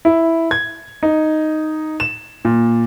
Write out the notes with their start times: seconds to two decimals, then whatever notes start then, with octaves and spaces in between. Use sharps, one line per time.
0.05 E4
0.51 G#6
1.03 D#4
2.00 E7
2.45 A#2